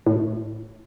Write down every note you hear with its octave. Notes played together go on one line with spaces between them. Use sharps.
A2